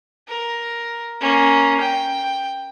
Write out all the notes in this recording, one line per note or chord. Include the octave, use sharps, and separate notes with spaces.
A#4
A#3 C#4
G5